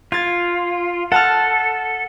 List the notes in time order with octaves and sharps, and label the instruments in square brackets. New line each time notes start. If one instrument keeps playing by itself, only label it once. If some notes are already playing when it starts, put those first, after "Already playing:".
[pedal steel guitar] F4 [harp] G#6 A6
[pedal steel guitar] A4 [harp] F#5 A5 F6